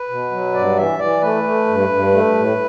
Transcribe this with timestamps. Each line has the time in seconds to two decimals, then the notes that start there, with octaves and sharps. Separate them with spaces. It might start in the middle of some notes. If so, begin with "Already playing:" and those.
Already playing: B4
0.09 B2
0.31 F#3
0.54 G2 D5
0.76 E3 E5
0.99 E3 D5
1.21 A3 B4
1.43 A3
1.67 G2
1.89 G2
2.12 A3
2.34 A2